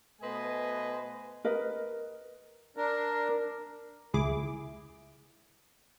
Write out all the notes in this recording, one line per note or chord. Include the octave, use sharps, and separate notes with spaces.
B2 A3 B4 C5 D#5 G#5
A#4 B4 D#5
D4 A#4
C#2 E4 G#4 D6